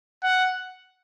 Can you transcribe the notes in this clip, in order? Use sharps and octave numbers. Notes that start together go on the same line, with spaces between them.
F#5